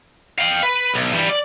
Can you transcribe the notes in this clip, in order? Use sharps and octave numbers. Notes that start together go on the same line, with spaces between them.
F5 G5
B4
B1
E3 G3
D5